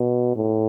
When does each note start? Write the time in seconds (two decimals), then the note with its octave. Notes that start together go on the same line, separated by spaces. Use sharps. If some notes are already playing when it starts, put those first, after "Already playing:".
Already playing: B2
0.36 A2